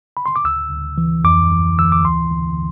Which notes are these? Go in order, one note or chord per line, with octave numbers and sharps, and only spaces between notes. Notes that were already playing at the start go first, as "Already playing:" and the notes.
B5
C6
D6
D2 E6
D2
E3
F2 D6
E3
E3 E6
D6
D2 C6
D3